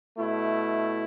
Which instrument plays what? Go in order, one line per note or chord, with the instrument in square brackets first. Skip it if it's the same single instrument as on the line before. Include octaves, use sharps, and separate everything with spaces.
[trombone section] B2 A3 E4